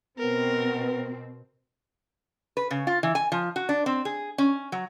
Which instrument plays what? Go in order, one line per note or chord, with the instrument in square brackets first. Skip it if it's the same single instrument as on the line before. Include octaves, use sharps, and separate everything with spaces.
[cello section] B2 C4 [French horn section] B3 [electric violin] A#4
[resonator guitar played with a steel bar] B4
C#3
F4
E3
G#5
F3
F#4
D4
C4
G#4
C#4
F#3